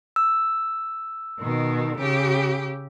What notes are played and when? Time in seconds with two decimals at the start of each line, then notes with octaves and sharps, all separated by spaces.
0.16 E6
1.40 B2 D#3
1.98 C#3 G4